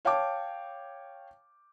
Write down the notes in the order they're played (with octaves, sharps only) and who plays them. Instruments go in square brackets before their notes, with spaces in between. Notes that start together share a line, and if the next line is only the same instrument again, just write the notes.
[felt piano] C#5 F5 G5 A5 D6